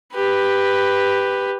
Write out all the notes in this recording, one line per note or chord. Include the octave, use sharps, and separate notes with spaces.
G4 B4